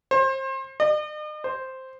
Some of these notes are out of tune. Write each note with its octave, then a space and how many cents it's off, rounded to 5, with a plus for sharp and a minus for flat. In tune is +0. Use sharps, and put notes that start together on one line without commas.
C5 +30
D#5 -45
C5 +0